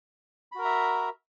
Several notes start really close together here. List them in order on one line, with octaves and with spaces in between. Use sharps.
B5 F#4 A#4 A#5 E5